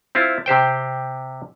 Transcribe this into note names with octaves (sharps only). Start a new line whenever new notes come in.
C4 E4 F4
C3 G4 C5 G5